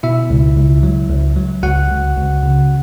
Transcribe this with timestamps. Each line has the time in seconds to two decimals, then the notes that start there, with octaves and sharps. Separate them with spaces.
0.03 B2 E4 E5
0.30 C#2
0.57 C#2
0.83 F#3
1.10 C#2
1.36 F#3
1.63 C#2 F#4 F#5
1.90 C#2
2.16 C#2
2.43 C#3